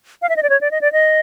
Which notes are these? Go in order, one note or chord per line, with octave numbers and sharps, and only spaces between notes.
F5
E5
D#5
D5
C#5
D5
D#5
D5
D#5